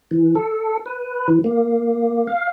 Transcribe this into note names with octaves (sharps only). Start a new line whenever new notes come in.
E3
A4
B4
E3
A#3
F5